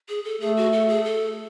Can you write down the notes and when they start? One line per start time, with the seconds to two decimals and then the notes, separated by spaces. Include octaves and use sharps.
0.09 G#4
0.25 A4
0.40 A3 G#4
0.57 F#4
0.73 A4
0.89 G#4
1.05 A4